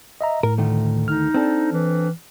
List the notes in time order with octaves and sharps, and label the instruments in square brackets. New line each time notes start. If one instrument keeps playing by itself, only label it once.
[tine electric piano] D#5 E5 A#5
[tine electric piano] A2 [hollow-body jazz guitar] A#4
[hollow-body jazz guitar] D2 D#3 A3
[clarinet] D#4 [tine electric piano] F6
[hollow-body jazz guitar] C4 D4 A4
[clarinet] E3